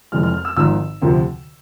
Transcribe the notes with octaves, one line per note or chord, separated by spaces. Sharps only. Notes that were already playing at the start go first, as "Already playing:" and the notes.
F1 F2 E3 G#3 F6
F6
F6
E6
G#1 G#2 F3 E6
D2 C3 F3